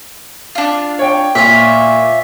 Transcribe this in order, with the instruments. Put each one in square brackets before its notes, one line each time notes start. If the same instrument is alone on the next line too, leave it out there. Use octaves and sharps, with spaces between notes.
[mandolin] D4 F4
[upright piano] C#5 G5
[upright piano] A#2 [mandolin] F4 C#5 E5